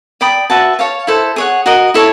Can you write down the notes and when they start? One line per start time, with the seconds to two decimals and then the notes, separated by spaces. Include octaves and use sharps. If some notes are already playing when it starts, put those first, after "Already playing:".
0.21 D5 G5 B5 D#6
0.50 F#4 B4 E5 A5
0.79 C#5 F5 A5
1.07 E4 A4 C5
1.36 G#4 C#5 F#5
1.66 F#4 A#4 D#5
1.94 E4 A4 C#5